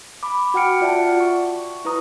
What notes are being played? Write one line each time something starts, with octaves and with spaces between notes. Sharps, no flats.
B5 D6
F#4 F#5 G5 F6 C#7 D7
F4 D5 E5 F#5 A5
C#6
E4 B4 A#5 D#6